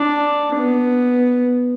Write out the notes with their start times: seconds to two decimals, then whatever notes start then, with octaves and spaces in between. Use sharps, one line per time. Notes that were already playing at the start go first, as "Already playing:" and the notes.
Already playing: D4
0.56 B3